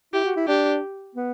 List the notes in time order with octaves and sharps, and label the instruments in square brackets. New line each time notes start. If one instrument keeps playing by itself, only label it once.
[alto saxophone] E4 [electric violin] G4
[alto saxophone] F#4
E4
[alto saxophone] D4 [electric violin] G4
[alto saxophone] B3